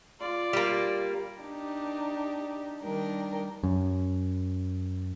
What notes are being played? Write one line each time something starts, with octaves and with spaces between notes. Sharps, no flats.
F4 D5
G3 A#3
D4 D#4 G4
D#3 G3 D4 A#4 G5
F#2